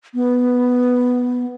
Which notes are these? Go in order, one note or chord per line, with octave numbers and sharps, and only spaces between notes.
B3